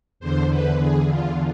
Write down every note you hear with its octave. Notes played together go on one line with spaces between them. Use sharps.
E2 D3 C5
B4
G#4
F4